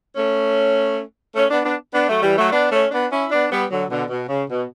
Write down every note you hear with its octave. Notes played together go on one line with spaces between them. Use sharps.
A3 C#4
A3 C#4
B3 D4
B3 D4
B3 D4
F#3 A3
E3 G3
F#3 A3
B3 D4
A3 C#4
B3 D4
C#4 E4
B3 D4
G3 B3
D3 F#3
B2 D3
B2
C#3
B2